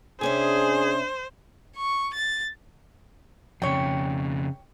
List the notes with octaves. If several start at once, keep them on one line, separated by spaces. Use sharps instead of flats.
C3 C#4 D4 G#4 C5 E5
C#6
A6
F2 C#3 C#5 G5